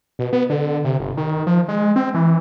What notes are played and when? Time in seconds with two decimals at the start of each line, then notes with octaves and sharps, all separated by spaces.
0.19 B2
0.33 B3
0.50 D3
0.85 C3
1.00 G1
1.17 D#3
1.47 F3
1.69 G#3
1.96 C4
2.14 E3